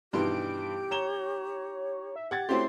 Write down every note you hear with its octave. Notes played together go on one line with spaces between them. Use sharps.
G2 B2 D#3 E3 G3 G4 C6 D7
C#5 A#5 E7 G7
E5
G4 F#5 G#6 A6
A3 C4 C#4 E4 F#4 G4 C5 C6